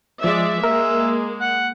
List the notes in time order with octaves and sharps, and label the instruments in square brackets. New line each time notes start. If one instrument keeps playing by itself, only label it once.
[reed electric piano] F3 [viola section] G#3 D5 E5
[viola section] G#3 A#3 [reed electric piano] A#4 [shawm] E5
[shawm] F#5